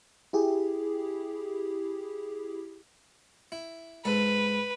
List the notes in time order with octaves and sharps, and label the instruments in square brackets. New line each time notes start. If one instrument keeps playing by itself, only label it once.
[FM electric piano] E4 G4 G#4
[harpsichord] E4
[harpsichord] G#2 A4 [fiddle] B4